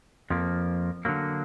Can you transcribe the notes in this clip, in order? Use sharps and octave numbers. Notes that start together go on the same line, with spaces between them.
F2 F3 A#3
D3 F#3 A#3